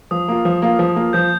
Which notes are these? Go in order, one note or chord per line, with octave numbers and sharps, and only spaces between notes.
F3 D#6
A#3 F4
F3
A#3 F4
F3
A#3 F4
F3 G6